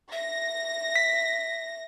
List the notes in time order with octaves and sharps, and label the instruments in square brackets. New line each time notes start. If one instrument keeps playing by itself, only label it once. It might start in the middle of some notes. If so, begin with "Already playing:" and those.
[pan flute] E5 [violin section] A#6
[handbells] B6